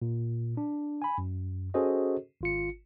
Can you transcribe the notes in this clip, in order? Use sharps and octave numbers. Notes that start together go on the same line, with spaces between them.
A#2
D4
G#5 B5
F#2
C#4 F#4 G#4 A4 C5 D#5
G#1 F4 C#7